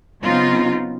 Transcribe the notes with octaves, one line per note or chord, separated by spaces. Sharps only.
C#3 F#3 B3 C4 D#4 F4